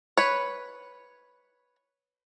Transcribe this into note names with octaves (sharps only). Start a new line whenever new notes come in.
B4 C#5